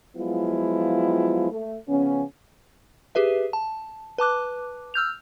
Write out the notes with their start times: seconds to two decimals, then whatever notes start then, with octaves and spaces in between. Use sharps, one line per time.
0.17 F3 F#3 G#3 B3 E4 F4
1.51 A3
1.89 C#3 F3 B3 C#4
3.15 G4 G#4 B4 E5
3.53 A5
4.18 B4 A5 D6 F#6
4.94 E6 F6 G6 F7